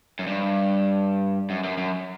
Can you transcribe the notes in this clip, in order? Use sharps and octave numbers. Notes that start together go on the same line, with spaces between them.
F#2
G2
F#2
F#2
F#2